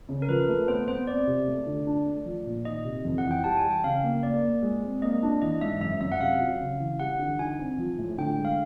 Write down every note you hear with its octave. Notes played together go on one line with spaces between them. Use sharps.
C#3
A#4
F3 B4
A3
B3 C5
B3 C5
C4 D5
C3
A3
D3
D4
A3
F3
A#2
D#3 D#5
C3
F2
F#5
E3
G5
G3 A5
G#5
G3
G5
C#3 F5
A#3
A#3 D5
A#3
G#3
C4
A#3 D#5
D4
E3 D#5
G#2 E5
F#2 E5
F#2 E5
F#5
C3 F5
F#3
C#3
E3
G3 F#5
D3
D#4 G#5
C4
F3
A2
D3 G5
G#3
F5